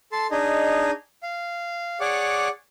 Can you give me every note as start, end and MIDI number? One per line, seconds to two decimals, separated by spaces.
0.12 0.27 69
0.12 0.27 81
0.12 0.27 84
0.31 0.91 62
0.31 0.91 63
0.31 0.91 68
0.31 0.91 75
1.23 1.99 77
2.01 2.48 68
2.01 2.48 73
2.01 2.48 74
2.01 2.48 78
2.01 2.48 86